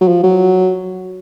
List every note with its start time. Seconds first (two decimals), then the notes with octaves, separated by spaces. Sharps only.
0.01 F#3
0.08 F3
0.23 F#3